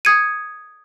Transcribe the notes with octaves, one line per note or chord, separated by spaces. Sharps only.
D#6 G#6 C#7 D#7